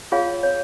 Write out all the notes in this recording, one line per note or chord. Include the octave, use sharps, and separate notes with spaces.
F4 G#4 C#5 F5
C#5